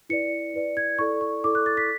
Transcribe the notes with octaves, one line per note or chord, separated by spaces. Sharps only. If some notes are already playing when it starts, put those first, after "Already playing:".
E4 B4 D5 C#7
E4 B4 D5
G#6
E4 A4 D5 C#6
C#6
E4 A4 D5 D6
F#6
A6
B6